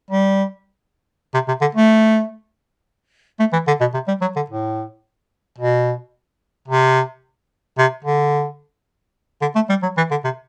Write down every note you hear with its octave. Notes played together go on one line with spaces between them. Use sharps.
G3
C3
C3
D3
A3
A3
E3
D3
B2
C3
G3
F#3
D3
A2
B2
C3
C3
D3
D3
A3
G3
F#3
E3
D3
C3